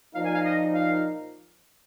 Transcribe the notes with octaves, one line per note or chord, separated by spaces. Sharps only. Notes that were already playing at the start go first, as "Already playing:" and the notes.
A#2 F3 A#3 D#4 F5
G#5
F5
D#5
F5